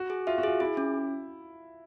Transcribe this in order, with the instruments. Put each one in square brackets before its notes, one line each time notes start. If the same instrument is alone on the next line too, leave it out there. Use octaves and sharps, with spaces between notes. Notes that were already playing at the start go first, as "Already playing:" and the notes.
Already playing: [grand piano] F#4
[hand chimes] G#4
[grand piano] F4 [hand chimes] E5
[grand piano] F#4
[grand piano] F4 [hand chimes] G#4
[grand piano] E4 [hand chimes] G#4
[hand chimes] C#4